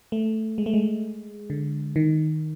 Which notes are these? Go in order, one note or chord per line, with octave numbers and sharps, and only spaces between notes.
A3
G#3
A3
G#3
D3
D#3